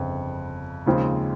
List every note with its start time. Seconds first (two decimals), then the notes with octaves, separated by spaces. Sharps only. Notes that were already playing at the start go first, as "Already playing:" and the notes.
Already playing: G1 F2 C#3
0.86 D#2 C#3 F3 G#3 C4